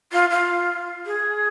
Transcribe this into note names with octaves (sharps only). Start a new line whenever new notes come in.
F4
F4
G#4